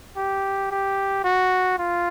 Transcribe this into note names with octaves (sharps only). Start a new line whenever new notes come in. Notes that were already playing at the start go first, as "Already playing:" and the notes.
G4
G4
F#4
F4